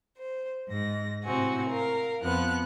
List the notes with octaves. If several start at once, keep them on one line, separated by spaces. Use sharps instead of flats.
C5
G#2 A#6
A2 C3 C4 F#4 G#5
A#4 F5
F2 F3 B3 F#6